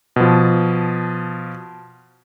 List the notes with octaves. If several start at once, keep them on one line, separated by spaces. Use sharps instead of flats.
B2 F3